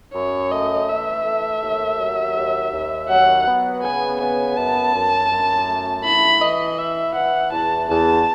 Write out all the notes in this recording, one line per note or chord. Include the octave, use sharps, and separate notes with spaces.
F#2 C#5
A3 D#5
E3 E5
A3
D#2
F#3
D#2
D#2
F#3 F#5
B3
C#3 G#5
B3 G#5
F#2 A5
F#2
F#2
A3
E4 B5
E3 D#5
E4 E5
E3 F#5
E2 A5
E2 A5